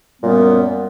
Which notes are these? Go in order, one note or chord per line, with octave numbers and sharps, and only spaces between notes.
F#2 A#2 G3 B3